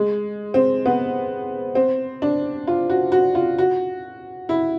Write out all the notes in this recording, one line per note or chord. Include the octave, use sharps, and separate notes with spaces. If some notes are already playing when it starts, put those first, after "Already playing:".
Already playing: G#3
C4
B3
C4
D4
F4
F#4
F#4
F4
F#4
E4